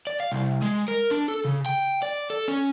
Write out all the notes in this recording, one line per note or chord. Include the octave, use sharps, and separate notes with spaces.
D5
F5
C2
G#3
A#4
D4
A4
C#3
G5
D5
A4
C#4